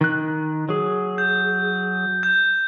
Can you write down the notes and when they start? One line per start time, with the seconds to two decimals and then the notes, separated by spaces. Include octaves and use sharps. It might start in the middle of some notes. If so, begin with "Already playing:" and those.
0.01 D#3 F#6
0.69 F#3 G#4
1.18 G6
2.23 G6